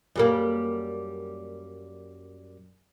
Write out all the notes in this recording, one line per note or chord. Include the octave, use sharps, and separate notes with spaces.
F#2 G3 A#3